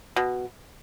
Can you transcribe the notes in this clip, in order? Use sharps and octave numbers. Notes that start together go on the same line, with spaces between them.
B2